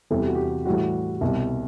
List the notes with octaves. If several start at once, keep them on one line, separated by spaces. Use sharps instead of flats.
E2 C3 E3 G3 A4
G4
F#4
G4
A2 E3 G3 F#4
C2 B2 G3